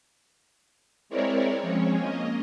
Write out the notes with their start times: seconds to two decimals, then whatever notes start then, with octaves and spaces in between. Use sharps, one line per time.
1.09 G#3 C4 E4 A#4 C#5 D5
1.62 F3 G#3 C4 C#4 C#5
1.97 A#3 C#4 D#5